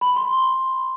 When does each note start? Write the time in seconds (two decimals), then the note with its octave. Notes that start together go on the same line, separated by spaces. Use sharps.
0.01 B5
0.16 C6